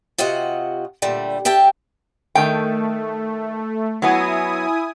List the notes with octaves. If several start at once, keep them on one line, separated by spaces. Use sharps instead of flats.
C3 F4 F#4 D#5 F#5
A#2 D3 G3 A3
G4 E5 G5 A5
D#3 A3 G5
F#3 B3 E4 G#5 D#6